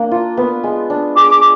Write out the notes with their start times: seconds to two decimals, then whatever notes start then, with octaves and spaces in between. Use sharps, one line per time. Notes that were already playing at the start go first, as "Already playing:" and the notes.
Already playing: A#3 D4
0.11 F4
0.37 B3
0.64 G#3
0.90 D4
1.16 G#4 D6